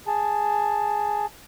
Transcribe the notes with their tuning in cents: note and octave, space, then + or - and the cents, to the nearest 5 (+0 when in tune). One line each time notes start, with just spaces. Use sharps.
G#4 +0 A5 +0